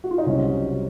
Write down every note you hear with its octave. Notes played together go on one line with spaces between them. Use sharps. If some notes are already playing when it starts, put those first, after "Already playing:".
F#4
F4
D#4
C2 C3 F#3 C#4